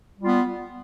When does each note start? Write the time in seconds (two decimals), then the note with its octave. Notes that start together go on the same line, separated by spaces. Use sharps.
0.19 G3
0.23 F4
0.27 B3